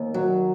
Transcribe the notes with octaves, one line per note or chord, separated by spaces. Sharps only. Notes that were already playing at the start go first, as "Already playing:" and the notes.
Already playing: D#2
F#3